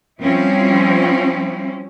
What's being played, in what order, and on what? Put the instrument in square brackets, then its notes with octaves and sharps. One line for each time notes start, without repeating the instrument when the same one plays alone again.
[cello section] F3 G3 C4 C#4 E4